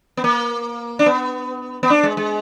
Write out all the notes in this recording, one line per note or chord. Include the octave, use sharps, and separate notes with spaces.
B3
A#3
D4
B3
B3
D4
G#3
G#3